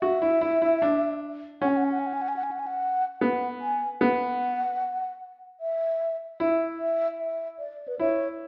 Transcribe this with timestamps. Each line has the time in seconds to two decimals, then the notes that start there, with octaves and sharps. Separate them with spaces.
0.01 F#4 E5
0.22 E4
0.41 E4
0.62 E4
0.82 D4
1.61 C#4 F#5
1.69 G#5
1.77 F#5
1.84 G#5
1.92 F#5
1.99 G#5
2.07 F#5
2.14 G#5
2.21 F#5
2.28 G#5
2.36 F#5
2.43 G#5
2.51 F#5
2.59 G#5
2.67 F#5
3.21 B3 F#5
3.61 G#5
4.01 B3 F#5
5.60 E5
6.40 E4 E5
6.79 E5
7.20 E5
7.59 D5
7.88 B4
7.99 E4 C#5